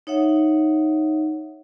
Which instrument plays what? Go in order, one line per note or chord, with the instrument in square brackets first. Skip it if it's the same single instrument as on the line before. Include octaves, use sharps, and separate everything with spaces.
[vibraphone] D#4 C#5 E5 F#5